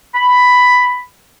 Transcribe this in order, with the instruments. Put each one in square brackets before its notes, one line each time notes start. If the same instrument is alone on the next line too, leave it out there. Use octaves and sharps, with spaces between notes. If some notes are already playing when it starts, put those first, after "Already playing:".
[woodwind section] B5